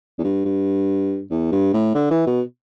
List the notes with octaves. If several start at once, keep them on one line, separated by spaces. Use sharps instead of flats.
E2
G2
G2
E2
G2
A2
D3
E3
B2